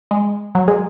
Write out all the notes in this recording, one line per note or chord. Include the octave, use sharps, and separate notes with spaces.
G#3
F#3
G#3